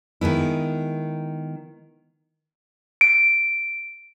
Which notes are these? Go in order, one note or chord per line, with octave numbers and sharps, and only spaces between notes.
D#3 G#3 B3 E4
D7